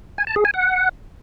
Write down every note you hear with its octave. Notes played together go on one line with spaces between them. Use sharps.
G#5
A5
G#4
G#5
F#5